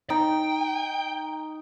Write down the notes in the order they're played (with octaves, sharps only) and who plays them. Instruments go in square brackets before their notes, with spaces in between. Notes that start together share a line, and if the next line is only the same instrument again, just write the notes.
[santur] D#4 [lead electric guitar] G5